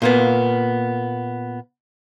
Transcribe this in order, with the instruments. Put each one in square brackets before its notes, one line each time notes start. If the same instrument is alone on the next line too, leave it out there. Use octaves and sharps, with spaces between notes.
[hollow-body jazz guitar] A#2 A#3 B3